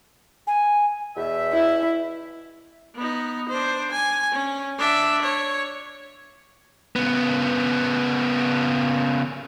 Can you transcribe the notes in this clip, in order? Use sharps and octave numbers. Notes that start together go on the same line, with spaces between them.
G#5
E2 B2 E5
E4
B3 D#4
D4 C5
G#5
C#4
D4 E5
C#5
C#3 B3